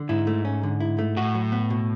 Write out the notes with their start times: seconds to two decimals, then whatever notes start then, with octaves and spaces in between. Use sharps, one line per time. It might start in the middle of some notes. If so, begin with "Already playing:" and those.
Already playing: D3
0.09 G#2 E4
0.27 A3
0.45 C#4
0.63 D3
0.80 E4
0.98 A3
1.17 A2 F#4
1.35 F#3
1.52 B3
1.70 B2